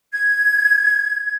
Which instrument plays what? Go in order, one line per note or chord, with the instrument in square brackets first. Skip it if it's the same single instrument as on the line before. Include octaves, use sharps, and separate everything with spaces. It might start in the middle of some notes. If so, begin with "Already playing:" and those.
[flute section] G#6